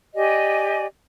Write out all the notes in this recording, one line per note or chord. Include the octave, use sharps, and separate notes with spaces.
G4 D5 D#5 G#5